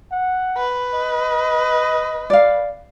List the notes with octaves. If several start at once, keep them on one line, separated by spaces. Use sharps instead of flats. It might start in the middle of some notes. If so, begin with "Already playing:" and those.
F#5
B4
D#5
D5 F5